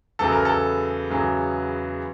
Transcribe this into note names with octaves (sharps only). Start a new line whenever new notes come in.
E2 C#3 F#3 B3 A4
A#4
A4
E2 C#3 F#3 B3